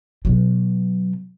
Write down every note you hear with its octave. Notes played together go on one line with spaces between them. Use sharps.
B2 F#3